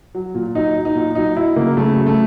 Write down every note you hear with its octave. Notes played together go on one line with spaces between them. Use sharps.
F#3
A#2
F#3 D#4
F#3
D#4
A#2
F#3 D#4
F#3 E4
C#3 A#3
C#3 A3
F#3
A3